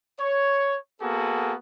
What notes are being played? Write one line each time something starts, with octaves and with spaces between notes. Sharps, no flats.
C#5
A#3 B3 F#4 G#4 A4